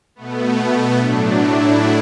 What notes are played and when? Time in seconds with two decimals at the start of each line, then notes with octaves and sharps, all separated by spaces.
0.15 B2 A3 B3
0.97 A2 F#3 A3 D4
1.38 E4